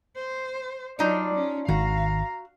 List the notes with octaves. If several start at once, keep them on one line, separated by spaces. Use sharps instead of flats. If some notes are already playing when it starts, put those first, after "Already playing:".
C5
F#3 D4 D#4 F4 D5
C#4
G#1 D#3 F#4 F5 A#5